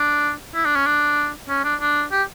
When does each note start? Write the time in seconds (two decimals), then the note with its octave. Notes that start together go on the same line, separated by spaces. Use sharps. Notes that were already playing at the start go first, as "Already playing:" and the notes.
Already playing: D4
0.55 E4
0.65 D4
0.75 C#4
0.86 D4
1.49 C#4
1.64 D4
1.81 D4
2.12 G4